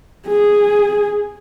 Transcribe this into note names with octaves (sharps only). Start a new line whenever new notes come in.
G#4